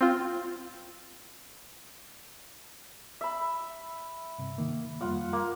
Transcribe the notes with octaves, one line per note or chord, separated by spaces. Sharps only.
C4 F4
E5 B5
G2 C3
D#3 A#3
F2 G3 A#3 F4 F#5
A#3